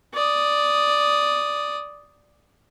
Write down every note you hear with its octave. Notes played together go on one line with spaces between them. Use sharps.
D5 D#6